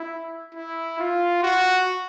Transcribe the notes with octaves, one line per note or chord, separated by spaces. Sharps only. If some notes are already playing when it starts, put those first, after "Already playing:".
Already playing: E4
E4
F4
F#4